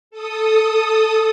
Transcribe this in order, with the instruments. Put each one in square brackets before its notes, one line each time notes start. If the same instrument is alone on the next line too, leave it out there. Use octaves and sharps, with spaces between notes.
[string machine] A4 D#6